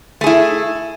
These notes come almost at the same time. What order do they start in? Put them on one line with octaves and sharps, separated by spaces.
A3 G#4 E4